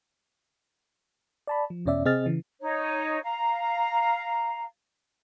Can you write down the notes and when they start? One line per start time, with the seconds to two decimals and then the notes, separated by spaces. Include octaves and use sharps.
1.47 D5 A5 B5
1.70 F3
1.86 E2 B2 C#4 D5 E5
2.05 C3 C4 G#4 D#5 F6 A6
2.26 C#3 E3
2.61 D#4 C#5
3.23 F5 A#5